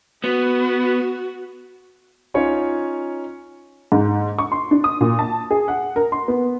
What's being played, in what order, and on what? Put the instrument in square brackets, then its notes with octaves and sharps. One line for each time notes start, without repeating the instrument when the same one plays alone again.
[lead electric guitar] B3 [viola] F#4
[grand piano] C#4 D#4 F4 C#5
[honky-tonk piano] G#2
C#6
C6
D4
D#6
A#2
A5
G#4
F#5
A#4
C6
B3